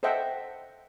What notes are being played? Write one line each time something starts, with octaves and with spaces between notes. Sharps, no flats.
A4 C5 D#5 E5 F#5 G5